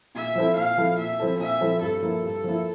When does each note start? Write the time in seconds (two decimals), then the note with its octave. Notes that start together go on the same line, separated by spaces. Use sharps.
0.15 A#2 E5
0.35 F3 C4 E4 A4
0.56 A#2 F5
0.77 F3 C4 E4 A4
0.98 A#2 E5
1.20 F3 C4 E4 A4
1.40 A#2 E5
1.61 F3 C4 E4 A4
1.81 G2 A4
2.02 F3 A#3 E4
2.23 G2
2.44 F3 A#3 E4